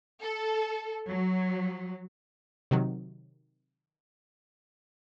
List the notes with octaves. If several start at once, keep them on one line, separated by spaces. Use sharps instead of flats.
A4
F#3
C3 D#3 F#3